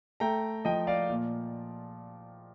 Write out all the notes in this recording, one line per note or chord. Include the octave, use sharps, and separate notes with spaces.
A3 G5 A#5
F3 D#5 G5
D5 F5
A#2